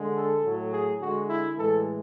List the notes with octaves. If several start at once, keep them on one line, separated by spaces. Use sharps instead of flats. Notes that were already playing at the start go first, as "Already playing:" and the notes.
Already playing: D3 G#3
A4
A2 F#3 A3
G#4
D3 G#3 F#4
E4
A2 E3 G#3 A4